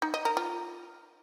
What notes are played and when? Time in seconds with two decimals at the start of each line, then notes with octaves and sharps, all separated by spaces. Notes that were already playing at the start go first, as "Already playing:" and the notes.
0.02 D#4
0.14 D#5
0.25 A#4
0.37 F4